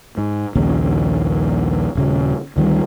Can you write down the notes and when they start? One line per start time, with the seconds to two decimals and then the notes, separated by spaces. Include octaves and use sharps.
0.18 G#2
0.55 A#1 D#2 C#3
1.95 D#1 C#3
2.56 D2 D#3 G3